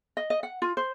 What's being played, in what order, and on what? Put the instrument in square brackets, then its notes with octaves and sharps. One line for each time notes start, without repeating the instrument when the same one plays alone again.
[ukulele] D#5
D#5
F#5
F4
C5